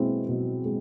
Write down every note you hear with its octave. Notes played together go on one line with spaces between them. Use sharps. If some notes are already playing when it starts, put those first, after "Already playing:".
Already playing: B2 G#3 C4 E4
B2
G#3